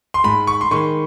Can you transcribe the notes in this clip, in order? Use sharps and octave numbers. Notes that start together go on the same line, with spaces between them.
C6
G#2 B5
C#6
C6
D#3 G#3 C#6